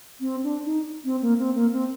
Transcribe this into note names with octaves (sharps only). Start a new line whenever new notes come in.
C4
D4
D#4
C4
A#3
C4
A#3
C4